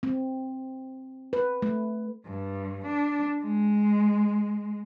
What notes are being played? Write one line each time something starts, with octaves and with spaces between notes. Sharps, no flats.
C4
B4
A3
G2
D4
G#3